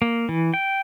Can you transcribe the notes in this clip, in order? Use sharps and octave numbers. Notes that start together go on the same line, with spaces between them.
A#3
E3
G5